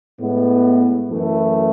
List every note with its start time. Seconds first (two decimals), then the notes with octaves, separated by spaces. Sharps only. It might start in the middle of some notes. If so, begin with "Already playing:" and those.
0.18 A2 G#3 B3
1.07 F#2 E3 A3